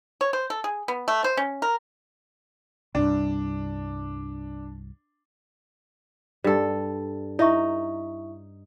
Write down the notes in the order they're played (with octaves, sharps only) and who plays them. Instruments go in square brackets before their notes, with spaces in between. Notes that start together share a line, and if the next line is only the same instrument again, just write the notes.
[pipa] C#5
C5
A4
G#4
B3
A3
C5
C#4
A#4
[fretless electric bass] C2 G2 [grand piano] D4
[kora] G2 A4
[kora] D#4 [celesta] E4 E5 C#6